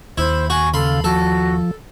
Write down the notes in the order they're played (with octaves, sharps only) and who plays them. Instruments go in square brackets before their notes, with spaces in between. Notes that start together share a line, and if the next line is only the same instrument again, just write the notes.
[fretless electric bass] D#2 [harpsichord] E4 [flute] C5
[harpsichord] F#4 [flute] G#5
[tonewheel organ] C#3 F5 [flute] A4 [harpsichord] B5 C6
[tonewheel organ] F3 [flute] F#4 [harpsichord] A4